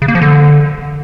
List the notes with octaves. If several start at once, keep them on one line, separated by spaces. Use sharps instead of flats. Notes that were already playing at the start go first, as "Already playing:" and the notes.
C#3
A#3
F3
D3